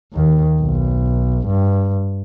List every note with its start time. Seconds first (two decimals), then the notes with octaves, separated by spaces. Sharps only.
0.13 D#2 D#3
0.61 B1
1.47 G2